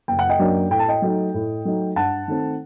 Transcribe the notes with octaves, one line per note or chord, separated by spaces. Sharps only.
F#1 G5
F#5
D#5 G5
F#2 F#3 A#3 D4
A2 G5
A5
D#5 G5
F#3 A3 D#4
A2
F#3 A3 D#4
G2 F#5 A5
D#3 A3 C4